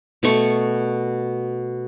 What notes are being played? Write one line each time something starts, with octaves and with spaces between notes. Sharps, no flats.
B2 A3 C#6